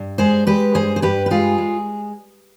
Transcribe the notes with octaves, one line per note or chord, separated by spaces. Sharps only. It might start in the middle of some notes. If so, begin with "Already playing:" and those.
Already playing: G2
G#3 G#4 C5
G#3 G4 B4
G2 G#4 C5
C5
G2 G4 B4
B4
G#3 F4 G#4
G#3